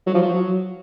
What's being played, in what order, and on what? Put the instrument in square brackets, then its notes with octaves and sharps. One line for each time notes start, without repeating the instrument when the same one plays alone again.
[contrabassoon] F#3
F3
F#3